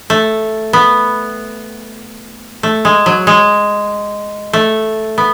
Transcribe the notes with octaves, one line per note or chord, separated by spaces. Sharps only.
A3
B3
A3
G#3
F#3
G#3
A3
B3